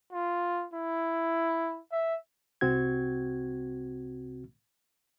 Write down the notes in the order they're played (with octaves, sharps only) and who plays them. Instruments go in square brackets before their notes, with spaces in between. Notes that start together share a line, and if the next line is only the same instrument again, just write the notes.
[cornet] F4
E4
E5
[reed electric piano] C2 C3 C4 F#4 G#6